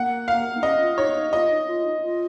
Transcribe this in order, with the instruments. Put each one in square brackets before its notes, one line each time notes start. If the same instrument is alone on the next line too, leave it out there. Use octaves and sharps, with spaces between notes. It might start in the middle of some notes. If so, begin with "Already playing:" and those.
Already playing: [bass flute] A#3 [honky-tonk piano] F#5
[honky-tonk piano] F5
[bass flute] D#4
[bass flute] C#4 [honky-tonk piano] D#5
[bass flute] F4
[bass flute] D#4 [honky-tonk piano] C#5
[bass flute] D#4
[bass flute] F4 [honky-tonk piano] D#5
[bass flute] D#4
F4
D#4
F4